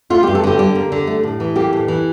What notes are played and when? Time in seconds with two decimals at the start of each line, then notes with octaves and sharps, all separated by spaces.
0.10 A3 F4
0.23 G2 G4
0.35 A4
0.44 D3 G4
0.59 G3 G4
0.75 A#3
0.92 D3
1.07 A3
1.23 A2
1.40 E3
1.56 A#3 G4
1.73 A2
1.88 E3